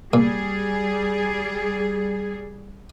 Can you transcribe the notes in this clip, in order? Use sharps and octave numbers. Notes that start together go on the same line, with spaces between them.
A#2 G3 G#4